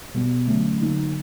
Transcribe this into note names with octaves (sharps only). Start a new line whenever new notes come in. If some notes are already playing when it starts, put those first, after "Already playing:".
B2 G3 B3
D3 F#3 A3 C#4
D3 F#3 A#3 D#4